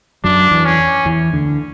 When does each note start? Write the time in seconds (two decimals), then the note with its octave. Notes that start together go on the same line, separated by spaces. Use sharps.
0.24 F#2 F#3 D4
0.51 E2 E3
0.65 C#4
1.05 E2 E3
1.33 D2 D3